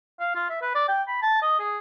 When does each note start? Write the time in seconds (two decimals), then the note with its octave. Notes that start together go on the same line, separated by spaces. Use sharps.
0.20 F5
0.35 F4
0.50 E5
0.62 B4
0.75 D5
0.88 G5
1.08 B5
1.22 A5
1.42 D#5
1.60 G#4